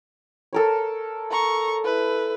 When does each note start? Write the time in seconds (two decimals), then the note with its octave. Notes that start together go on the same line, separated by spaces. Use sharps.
0.53 A4 A#4 C#5
1.31 A#5 C#6
1.84 E4 B4